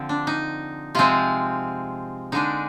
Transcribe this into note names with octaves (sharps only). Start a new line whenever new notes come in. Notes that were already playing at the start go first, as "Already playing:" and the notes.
Already playing: D3 F3 C4
D4
D#4
C3 F3 G#3 C4 F4
D3 G#3 D4 D#4